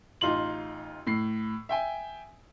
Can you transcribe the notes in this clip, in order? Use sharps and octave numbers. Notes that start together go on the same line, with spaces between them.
A1 D#4 F4 C6 F#7
A2 C7
E5 G5 G#5